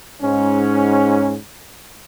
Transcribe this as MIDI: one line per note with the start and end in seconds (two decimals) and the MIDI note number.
0.22 1.36 44
0.22 1.36 61